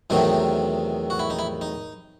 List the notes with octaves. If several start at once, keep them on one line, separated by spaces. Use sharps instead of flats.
E2 C3 D#3 F#3 A3 D#4
F#4
E4
D#4
E4
D#4